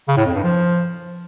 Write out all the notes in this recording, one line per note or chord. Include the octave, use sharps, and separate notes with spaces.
C#3
A2
F2
G2
F3